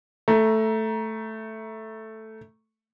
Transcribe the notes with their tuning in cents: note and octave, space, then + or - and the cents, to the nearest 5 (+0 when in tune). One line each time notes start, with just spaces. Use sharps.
A3 +0 A#5 +20